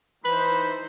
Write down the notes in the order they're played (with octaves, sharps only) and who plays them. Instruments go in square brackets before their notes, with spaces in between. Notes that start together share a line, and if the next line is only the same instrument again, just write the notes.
[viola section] E3 D#4 C5 [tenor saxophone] B4 [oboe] B5